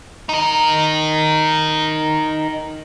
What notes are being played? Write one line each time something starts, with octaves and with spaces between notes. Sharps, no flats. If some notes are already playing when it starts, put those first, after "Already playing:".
D#4 A#4